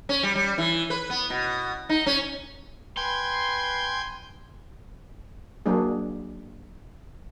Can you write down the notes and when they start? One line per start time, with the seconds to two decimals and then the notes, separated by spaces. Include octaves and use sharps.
0.09 C#4
0.23 G3
0.35 G3
0.58 E3
0.90 B4
1.10 B3
1.30 B2
1.89 D#4
2.06 C#4
2.97 B4 G5 G#5 C6
5.66 F#3 A#3 D4 G#4